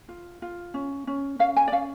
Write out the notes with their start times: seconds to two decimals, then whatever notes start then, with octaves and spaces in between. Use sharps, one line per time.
0.09 F4
0.42 F4
0.74 C#4
1.07 C#4
1.39 C#4 F5
1.57 G#5
1.68 D5
1.72 C#4 F5